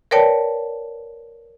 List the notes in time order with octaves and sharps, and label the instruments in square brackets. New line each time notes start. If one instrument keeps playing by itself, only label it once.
[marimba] A#4 B4 C#5 D5 G5 A5